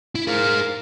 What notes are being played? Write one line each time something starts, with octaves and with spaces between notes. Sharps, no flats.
E4
G#4 A#4 C5 F5